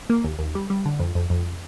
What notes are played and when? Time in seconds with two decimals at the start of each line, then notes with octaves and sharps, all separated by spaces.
0.10 A#3
0.24 D#2
0.39 D#2
0.55 G3
0.70 G3
0.86 D3
1.00 F2
1.15 F2
1.30 F2